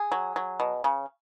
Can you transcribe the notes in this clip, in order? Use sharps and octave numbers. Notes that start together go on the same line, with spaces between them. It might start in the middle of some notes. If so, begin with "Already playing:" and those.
Already playing: G#4
F#3
F#3
B2
C#3